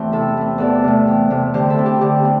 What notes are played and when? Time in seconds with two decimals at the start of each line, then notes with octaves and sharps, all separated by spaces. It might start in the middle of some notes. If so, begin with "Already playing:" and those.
Already playing: E2 E3 A3 C4 G4
0.12 C3 E4 A4
0.37 A3 C4
0.58 E2 A4 D5
0.84 C3 A3
1.07 E2
1.30 C3 A3
1.54 D3 G4 C5
1.70 E4 A4
1.79 C4
1.86 G4
2.01 D3 G4
2.25 C4